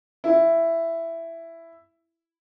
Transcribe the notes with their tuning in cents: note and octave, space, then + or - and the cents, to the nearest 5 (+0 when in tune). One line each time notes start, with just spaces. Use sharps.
E4 +10